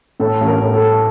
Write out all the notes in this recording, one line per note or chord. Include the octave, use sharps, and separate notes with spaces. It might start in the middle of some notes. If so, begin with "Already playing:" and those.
A2 A4
A1
A#4
A2
A4
A3